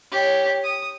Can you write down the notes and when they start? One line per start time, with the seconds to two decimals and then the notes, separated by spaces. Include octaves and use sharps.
0.12 G4 C#5
0.64 D#6